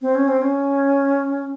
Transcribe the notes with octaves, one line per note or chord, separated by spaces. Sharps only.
C4
C#4
C4
C#4